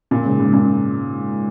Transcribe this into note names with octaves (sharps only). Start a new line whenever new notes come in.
A#2
G#2 C#3
G#2 C#3
A#2